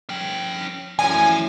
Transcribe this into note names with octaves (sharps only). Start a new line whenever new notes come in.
C#4 G5
F#2 A2 E3 F3 D4 G#5